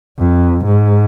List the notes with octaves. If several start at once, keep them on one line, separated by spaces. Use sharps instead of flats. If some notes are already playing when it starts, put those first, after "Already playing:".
F2
G#2